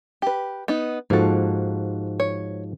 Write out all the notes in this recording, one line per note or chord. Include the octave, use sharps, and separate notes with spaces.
G4 B4
B3 D#4
G#2 F3 A#3 F#4 A4
C#5